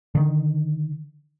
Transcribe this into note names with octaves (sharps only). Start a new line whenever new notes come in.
D3 D#3